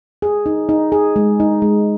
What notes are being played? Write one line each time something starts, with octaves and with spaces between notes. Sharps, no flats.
G#4
D#4
D#4
G#4
G#3
D#4
G#3